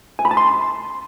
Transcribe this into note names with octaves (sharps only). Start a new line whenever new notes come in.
G#5
B5
A5
C6